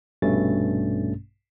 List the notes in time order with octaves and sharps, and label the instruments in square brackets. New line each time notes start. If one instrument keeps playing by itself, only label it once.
[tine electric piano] A#1 G2 B2 A3 C#4 A6